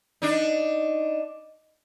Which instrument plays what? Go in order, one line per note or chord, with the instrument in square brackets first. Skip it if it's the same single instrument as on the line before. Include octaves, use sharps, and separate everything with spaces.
[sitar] D4 D#4